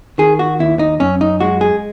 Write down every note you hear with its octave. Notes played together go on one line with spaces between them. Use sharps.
D#3 G#4
F#4
D#2 E4
D#4
F#2 C#4
D#4
G#3 F#4
G#4